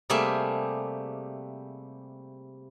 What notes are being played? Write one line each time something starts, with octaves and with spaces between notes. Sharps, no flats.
C3 G3 A3 A#3 G#4 E5